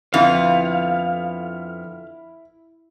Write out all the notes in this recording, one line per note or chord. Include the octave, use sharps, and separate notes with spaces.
F2 D3 B3 E4 F5